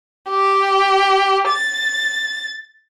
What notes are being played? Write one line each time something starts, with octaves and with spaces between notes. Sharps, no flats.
G4
A6